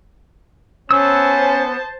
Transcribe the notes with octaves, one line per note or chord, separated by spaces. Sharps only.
B3 C#4 C5 A5 E6